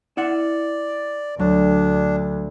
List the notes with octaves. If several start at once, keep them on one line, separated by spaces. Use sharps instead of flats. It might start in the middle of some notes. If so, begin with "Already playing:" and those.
E4 D5 F#5
D2 F#3 D4